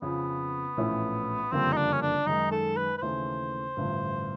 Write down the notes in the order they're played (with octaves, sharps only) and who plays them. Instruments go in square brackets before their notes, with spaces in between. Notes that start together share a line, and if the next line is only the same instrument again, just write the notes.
[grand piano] F2 C#3 F3 [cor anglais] B3
[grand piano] A#1 A2 E3 A3 C#4
[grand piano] F#1 F2 D3 G3 A#3 [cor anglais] C4
[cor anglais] D#4
D4
C#4
D4
[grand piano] F#2 D#3 G#3 [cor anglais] D#4
[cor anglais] A4
B4
B4
[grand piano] D#2 C#3 E3 A3 [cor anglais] C5
[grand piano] A1 G2 D3 F3 A3